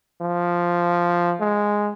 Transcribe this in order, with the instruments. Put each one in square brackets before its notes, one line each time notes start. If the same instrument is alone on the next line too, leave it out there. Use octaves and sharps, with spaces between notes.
[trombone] F3
G#3